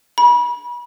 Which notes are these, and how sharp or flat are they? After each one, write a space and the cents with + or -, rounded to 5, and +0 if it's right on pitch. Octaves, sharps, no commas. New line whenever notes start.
B5 -35